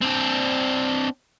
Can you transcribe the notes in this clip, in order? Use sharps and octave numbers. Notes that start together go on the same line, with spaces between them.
C4 D4